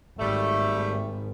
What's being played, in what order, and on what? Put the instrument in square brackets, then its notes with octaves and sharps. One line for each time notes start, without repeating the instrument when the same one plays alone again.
[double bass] G#1 [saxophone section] G3 A3